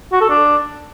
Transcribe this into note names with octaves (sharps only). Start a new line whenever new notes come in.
F#4
A4
D4